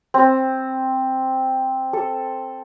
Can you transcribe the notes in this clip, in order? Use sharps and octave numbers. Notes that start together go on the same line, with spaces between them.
C4
A4